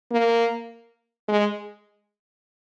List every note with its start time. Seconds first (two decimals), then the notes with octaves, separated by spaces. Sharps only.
0.11 A#3
1.28 G#3